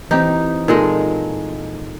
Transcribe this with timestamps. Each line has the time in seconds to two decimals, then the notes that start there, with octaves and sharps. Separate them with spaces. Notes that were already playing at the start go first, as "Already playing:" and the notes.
0.11 E3 C4 D#4 G4
0.68 A#2 G#3 D#4 A4 D#5